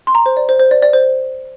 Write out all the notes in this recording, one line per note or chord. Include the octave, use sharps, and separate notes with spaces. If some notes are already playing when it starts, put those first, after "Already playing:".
C6
A#5
C5
D5
C5
C5
D5
D5
C5